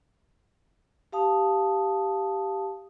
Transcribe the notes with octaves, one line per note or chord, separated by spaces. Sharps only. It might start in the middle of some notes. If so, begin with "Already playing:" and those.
G4 F5 A5 D#6